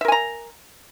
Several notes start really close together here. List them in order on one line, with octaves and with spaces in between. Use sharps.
E5 A#4 G#5 A#5